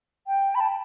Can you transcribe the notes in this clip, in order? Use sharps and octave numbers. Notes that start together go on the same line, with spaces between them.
G5
B5
A5